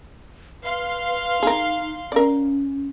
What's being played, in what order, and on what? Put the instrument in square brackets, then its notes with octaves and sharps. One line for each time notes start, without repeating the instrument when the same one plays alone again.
[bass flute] B4 [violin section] F5 C6
[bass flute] D#4 [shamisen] G#4 A#4
[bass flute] C#4 [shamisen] A#4 D5